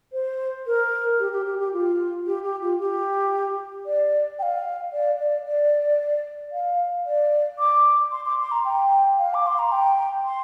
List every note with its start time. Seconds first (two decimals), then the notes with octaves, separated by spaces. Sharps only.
0.13 C5
0.67 A#4
1.19 G4
1.32 G4
1.46 G4
1.59 G4
1.73 F4
2.26 G4
2.44 G4
2.62 F4
2.79 G4
3.86 D5
4.39 G5
4.43 F5
4.93 D5
5.19 D5
5.46 D5
6.52 F5
7.06 D5
7.59 D6
8.12 C6
8.26 D6
8.39 C6
8.51 A#5
8.65 G5
9.18 F5
9.34 D6
9.47 C6
9.59 A#5
9.72 G5
10.25 C6